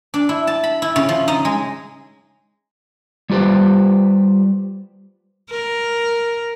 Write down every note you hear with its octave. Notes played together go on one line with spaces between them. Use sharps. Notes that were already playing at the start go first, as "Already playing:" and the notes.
D4
E4
A5
B5
E4
C#3
F3
D#4
G#3
G3 F4 G4 B4 C5
A#4